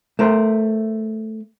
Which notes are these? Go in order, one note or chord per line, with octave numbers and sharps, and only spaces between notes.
A3 A#4 C5